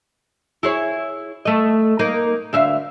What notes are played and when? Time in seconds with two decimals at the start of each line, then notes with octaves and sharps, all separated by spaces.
0.63 E4 G#4 C#5
1.45 A3 D#5
1.99 A#3 D#4
2.53 D2 E5 F5